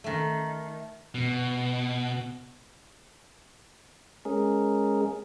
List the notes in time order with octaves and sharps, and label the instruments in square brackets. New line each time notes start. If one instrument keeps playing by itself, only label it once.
[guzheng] D#3 A3
[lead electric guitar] B2
[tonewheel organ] G#3 C#4 G#4 A#4